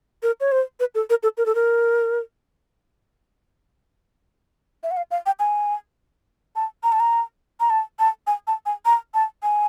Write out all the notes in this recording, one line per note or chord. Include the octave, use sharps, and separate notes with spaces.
A#4
C#5
C5
B4
A4
A#4
A4
A#4
A4
A#4
E5
F#5
F5
F5
G5
G#5
A5
A#5
A5
A#5
A#5
A5
A5
G#5
A5
G#5
A#5
A5
G#5